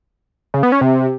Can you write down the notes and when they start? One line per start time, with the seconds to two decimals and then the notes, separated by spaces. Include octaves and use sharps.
0.54 C#3
0.63 B3
0.72 C#4
0.81 C3